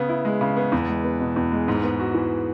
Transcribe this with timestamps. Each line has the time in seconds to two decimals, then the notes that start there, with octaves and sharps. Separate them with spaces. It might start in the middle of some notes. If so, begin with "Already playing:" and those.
Already playing: C#3 B3
0.09 E4
0.25 G#3
0.41 C#3
0.57 B3
0.72 E2
0.89 G#3
1.04 B3
1.20 B2
1.36 E2
1.52 G#3
1.68 G#2
1.84 B3
2.00 F#4
2.14 E3